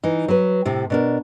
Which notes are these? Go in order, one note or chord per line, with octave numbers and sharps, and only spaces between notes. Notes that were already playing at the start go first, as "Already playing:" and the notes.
E3 D#4
F#3 B4
A2 C3 G4
B2 D4 A#4